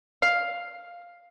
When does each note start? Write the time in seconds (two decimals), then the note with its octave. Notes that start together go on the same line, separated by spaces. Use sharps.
0.22 F5